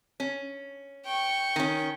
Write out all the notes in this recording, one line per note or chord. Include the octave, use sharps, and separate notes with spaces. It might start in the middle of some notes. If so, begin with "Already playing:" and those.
C#4
G5 C#6
D#3 C#4